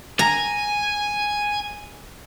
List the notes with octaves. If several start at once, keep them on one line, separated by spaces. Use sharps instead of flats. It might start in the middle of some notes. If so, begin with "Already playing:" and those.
G#5 A#5